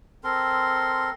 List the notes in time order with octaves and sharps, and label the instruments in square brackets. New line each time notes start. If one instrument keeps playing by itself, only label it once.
[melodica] C4 A4 A#4 C6